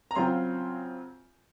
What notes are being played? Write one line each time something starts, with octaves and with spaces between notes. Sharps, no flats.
A#5
C#3 F#3 C4 F4 C6